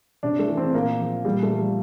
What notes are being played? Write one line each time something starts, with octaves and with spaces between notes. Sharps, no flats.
C3 D4
A3
E3
C4
A#2 A#3
F3
A#2 G3
A3
F3
G3